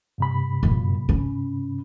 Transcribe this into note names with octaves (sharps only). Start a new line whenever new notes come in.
G2 C3 B5
F#2 A#2
C#4